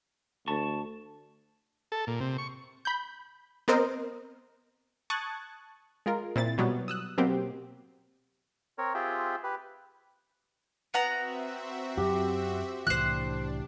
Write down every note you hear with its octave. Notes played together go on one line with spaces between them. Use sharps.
D2 A5 C#6
A4
A#2
C3
C#6
B5 G6
B3 C4 A#4 C5 D#5
A5 C#6 D#6 F#6 G#6 A6
G#3 F4 A#4
A#2 C4 E4 A6
B2 F#3 G3 B3
D#6 E6 F#6
B2 F#3 A#3 C4 G4
C4 A#4 C#5
C4 F4 G4 G#4 E5 G5
G4 B4
B3 C4 F#4 E5 F#5 A#5
F#2 F#3 G4
C2 A2 E3 D4 C5 F#6